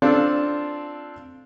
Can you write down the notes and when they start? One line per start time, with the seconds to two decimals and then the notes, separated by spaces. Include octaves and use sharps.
0.02 C4 D4 F4 A4